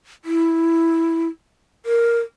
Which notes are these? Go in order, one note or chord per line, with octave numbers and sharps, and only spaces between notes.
E4
A#4